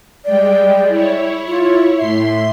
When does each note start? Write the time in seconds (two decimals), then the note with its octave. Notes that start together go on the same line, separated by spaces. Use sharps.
0.25 G3 G#3 D5 G5
0.88 E4 C#5
1.48 F4
1.97 A2 E5 C6 C7